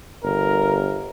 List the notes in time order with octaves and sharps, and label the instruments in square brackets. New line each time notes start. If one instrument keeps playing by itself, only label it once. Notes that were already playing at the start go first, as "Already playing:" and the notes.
[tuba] G1 [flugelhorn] A#4